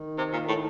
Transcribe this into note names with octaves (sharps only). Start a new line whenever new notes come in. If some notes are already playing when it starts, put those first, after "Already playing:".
Already playing: D#3
C3
A#2
A2